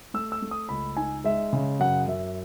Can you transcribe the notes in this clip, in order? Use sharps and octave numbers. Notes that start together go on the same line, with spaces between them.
A3 E6
E6
A3
D#6
C#2 B5
D#4 G#5
G#3 E5
C#3
F#2 F#5
F#2 E5